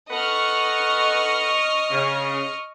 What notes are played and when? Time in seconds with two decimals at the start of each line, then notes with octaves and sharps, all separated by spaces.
0.10 A4 B4 D#5 F#5 C#6 F6
1.90 C#3